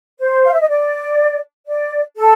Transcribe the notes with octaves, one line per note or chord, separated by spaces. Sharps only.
C5
F5
E5
D#5
D5
D5
A4